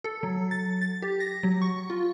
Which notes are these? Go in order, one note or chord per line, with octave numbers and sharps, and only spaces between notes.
A4
F#3
A6
A6
G4
A#6
F#3
C#6
F4